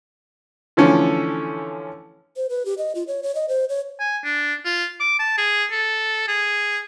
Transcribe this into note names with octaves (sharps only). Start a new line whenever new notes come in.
D3 E3 F3 A3 C#4 A4
C5
B4
G4
D#5
F4
C#5
C#5
D#5
C5
C#5
G#5
D4
F4
D6
A5
G#4
A4
G#4